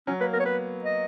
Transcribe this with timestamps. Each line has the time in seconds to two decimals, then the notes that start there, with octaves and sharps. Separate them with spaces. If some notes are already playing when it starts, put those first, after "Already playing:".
0.07 F#3 C#4
0.20 A#3 B4
0.33 B3 A#4
0.40 C#5
0.45 B3 B4
0.84 D#5